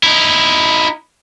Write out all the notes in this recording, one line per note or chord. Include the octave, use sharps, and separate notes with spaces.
D#4 E4